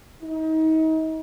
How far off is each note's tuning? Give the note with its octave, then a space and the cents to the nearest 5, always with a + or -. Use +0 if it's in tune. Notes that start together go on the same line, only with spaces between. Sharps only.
D#4 +35